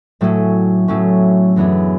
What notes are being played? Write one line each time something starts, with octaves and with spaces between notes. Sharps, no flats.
A2 F#3 A3 C#4
A2 F#3 A3 C#4
F#2 E3 B3 D4 G#4